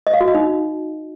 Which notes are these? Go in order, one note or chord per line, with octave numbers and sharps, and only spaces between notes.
D#5
F5
F#4
D#5
D#4